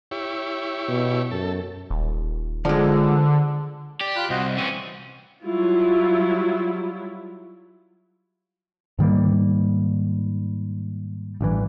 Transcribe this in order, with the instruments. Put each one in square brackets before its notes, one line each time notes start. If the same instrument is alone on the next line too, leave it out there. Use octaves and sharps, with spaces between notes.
[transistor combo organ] E4 G4 C#5
[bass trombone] B2
[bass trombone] F#2 [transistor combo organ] A4
[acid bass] D#1
[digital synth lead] D3 [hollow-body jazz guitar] F3 G#3
[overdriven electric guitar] G4 [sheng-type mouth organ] D5
[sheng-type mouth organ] F4 B5 F#6
[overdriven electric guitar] C2 [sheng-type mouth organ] F#4 C5 D#5
[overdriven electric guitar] E3 C#4 [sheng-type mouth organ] C4
[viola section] F#3 G3 E4 F4
[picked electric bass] G#2 D#3 G3 A#3
A1 G2 E3